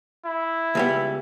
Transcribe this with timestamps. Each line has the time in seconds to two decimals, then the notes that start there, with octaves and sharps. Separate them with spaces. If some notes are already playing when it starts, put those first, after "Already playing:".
0.25 E4
0.75 C#2 G3 B3